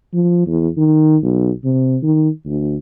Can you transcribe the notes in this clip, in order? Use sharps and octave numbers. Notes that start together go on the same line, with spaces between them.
F3
E2
D#3
B1
C3
D#3
D2